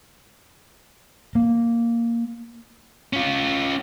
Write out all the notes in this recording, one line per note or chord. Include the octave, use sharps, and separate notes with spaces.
A#3
C#4 F4